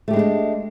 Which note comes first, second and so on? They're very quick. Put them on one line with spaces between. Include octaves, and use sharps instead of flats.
A3 G4 G#3 D#4 D4